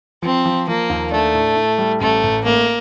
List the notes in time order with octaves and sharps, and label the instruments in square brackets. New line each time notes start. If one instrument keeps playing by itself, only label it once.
[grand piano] F3 [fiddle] C4
[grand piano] F3
[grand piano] F3 [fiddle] A#3
[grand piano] D#2
[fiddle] A3 [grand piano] D4
[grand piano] A2
A2
G3
[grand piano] A1 [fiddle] A3
[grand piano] A1
[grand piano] A3 [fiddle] A#3